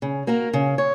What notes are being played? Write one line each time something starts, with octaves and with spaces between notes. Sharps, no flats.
C#3
A#3 F#4 A#4
C#3
C#5